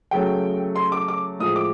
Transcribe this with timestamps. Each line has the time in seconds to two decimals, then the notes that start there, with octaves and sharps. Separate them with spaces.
0.11 C#3 F#3 A3 G5
0.76 C6
0.92 D6
1.08 D6
1.39 A2 F3 G#3 D#6
1.56 D6